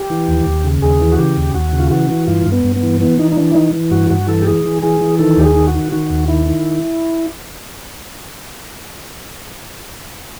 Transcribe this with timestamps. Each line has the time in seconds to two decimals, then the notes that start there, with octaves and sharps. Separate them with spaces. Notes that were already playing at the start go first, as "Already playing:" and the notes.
Already playing: G4
0.10 E3
0.28 D#2
0.46 D#2
0.64 C#3
0.82 D#2 G#4
1.01 E3
1.12 F#4
1.18 C#3 G4
1.37 D#2
1.54 D#2 F#4
1.73 C#3
1.79 F4
1.91 E3 F#4
2.10 E3
2.27 G2 F4
2.46 G2
2.52 B3
2.64 G2
2.76 B3
2.83 E3
3.01 E3 B3
3.19 E3 D#4
3.32 D#4
3.37 E3 D4
3.51 E4
3.55 E3 D#4
3.73 E3
3.91 G2 F#4
4.10 G2 F#4
4.27 E3 A4
4.42 G4
4.46 E3 G#4
4.65 E3
4.82 E3 G#4
5.01 E3
5.19 D#3 A4
5.37 D#2 G4
5.44 G#4
5.55 D#3
5.67 F#4
5.74 D#3
5.92 D#3 F#4
6.10 D#2
6.28 D#3 E4
6.46 D#3